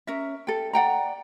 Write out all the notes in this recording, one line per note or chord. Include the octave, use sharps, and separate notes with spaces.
C#4 A#4 E5
A4 G5
D5 F#5 G5 A#5